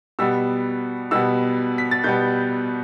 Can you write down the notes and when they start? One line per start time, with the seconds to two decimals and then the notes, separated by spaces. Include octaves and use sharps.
0.19 B2 G3 B3 E6
1.11 B2 G3 B3 E6
1.78 B6
1.91 A6
2.04 B2 G3 B3 G6